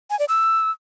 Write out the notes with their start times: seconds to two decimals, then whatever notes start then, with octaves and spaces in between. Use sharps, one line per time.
0.10 G#5
0.19 D5
0.28 E6